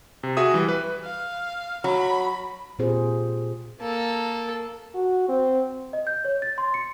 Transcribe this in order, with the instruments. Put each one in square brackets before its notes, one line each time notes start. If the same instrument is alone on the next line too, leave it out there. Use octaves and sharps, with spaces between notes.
[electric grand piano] C3
F#4 G#4 E5 D#6
E3 G3
B4
[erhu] F5
[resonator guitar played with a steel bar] F#3 [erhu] B5
[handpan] A#2 C4 F4 G4 G#4 C5
[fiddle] A#3 A4
[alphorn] F#4
C4
[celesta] D#5
G6
C#5
A6
C6
C#7